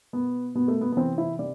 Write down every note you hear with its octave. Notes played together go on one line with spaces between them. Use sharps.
B2 B3
B2 B3
A3
B3
B3
C3 E3 C4
E4
C3 D5